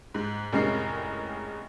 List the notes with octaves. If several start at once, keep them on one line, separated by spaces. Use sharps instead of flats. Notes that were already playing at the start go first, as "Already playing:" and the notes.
G#2
F1 A2 G#3 C#4 A#4 C7